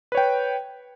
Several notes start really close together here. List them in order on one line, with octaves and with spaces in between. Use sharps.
B4 C#5 G5